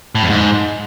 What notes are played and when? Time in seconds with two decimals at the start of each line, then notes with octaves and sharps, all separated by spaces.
0.15 A2
0.23 F2
0.30 G#2